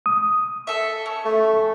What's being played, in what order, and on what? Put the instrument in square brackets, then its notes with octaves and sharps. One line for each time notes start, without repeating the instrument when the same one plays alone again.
[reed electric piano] D#6
[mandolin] A4 E5
C#4
[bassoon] A3